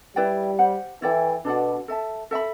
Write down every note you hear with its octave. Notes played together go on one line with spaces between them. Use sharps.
G3 E4 B4 D5 G5
G4 C5 F#5
E3 E4 A4 D5 G5
B2 D4 A4 D5 F#5
A4 E5 A5
A4 E5 B5